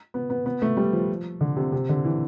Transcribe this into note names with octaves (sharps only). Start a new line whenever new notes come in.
B3
B3
B3
A3
G3
F3
D3
C3
C3
D3
E3